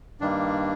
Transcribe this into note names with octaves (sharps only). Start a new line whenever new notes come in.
G2 D#3 G3 A#3 D4